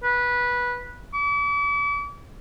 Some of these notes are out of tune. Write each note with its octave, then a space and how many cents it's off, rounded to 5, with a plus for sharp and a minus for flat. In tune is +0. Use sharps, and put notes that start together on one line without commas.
B4 -15
D6 -45